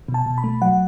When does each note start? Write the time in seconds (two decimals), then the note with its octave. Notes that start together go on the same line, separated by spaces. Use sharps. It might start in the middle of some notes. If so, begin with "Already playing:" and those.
0.08 B2
0.14 A5
0.26 B2
0.38 B5
0.44 A3
0.62 F#3 F#5